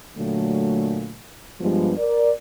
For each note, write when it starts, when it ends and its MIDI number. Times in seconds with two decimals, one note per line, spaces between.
0.16 1.16 46
0.16 1.16 50
0.16 1.16 54
0.16 1.16 57
1.61 1.93 43
1.61 1.93 53
1.61 1.93 55
1.61 1.93 56
1.61 1.93 59
1.98 2.31 70
1.98 2.31 74